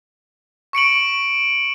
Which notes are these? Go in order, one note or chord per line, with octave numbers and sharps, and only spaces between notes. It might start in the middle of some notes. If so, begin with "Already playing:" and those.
C#6 C#7 D7 F#7